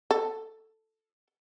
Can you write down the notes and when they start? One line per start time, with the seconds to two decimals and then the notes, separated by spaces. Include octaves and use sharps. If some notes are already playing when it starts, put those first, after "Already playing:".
0.11 A4